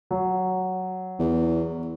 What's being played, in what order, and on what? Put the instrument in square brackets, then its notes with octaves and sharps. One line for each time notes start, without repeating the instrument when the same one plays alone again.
[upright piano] F#3
[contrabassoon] E2